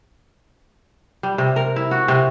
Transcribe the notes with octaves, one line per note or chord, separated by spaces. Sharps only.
G3
C3
A#4
E4
F#4
C3